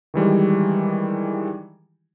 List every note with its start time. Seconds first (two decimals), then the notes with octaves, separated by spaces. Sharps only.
0.14 D#3 E3 G3 G#3